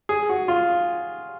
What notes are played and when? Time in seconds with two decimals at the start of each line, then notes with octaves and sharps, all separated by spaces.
0.09 G#4
0.29 F#4
0.48 F4